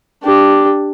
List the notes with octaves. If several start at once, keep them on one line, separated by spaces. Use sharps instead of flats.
D4 G4